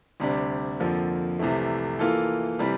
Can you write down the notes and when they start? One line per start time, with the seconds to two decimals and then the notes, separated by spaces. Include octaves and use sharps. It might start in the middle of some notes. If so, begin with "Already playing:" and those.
0.20 D2 C3 G3 D4
0.80 F2 D3 F3 A#3
1.39 C2 C3 E3 A3
1.99 E3 A#3 F4 A4
2.59 C3 E3 G3